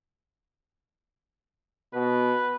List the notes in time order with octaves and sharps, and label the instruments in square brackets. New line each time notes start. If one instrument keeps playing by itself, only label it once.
[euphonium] B2 [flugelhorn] B4